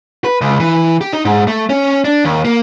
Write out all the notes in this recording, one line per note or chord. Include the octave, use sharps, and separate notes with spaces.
B4
C#2
E3
G4
D#4
G#2
A3
C#4
D4
D#2
A#3